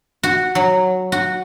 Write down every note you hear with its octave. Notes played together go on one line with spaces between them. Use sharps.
F#4
F#3
F#4